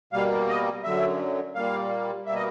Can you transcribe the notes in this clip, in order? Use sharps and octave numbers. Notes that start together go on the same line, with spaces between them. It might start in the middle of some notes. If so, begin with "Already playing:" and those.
B2 G3 A#3 F5
D#5
F#2 D3 F#3 E5
A#2 G3 A#3 F5
B2 G3 A#3 E5
D#5